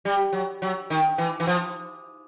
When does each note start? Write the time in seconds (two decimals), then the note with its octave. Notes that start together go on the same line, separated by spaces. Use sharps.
0.05 G3
0.33 F#3
0.62 F#3
0.90 D#3
1.18 E3
1.40 E3
1.47 F3